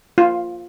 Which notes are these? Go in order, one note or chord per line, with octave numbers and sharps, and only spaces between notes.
F4